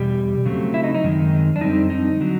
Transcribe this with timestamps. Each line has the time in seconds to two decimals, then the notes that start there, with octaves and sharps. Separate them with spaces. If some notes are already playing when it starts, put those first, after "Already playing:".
Already playing: E2 B2 G3 G4
0.46 C#3 F#3 A3 C4
0.74 E4
0.84 D#4
0.95 D#4
1.04 F#2 D#3 G#3 C4
1.56 D4
1.61 F2 D3 G3 C4 D#4
1.90 D#4
2.20 D3 F#3